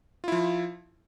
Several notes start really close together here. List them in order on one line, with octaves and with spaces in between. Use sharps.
F4 E4 F3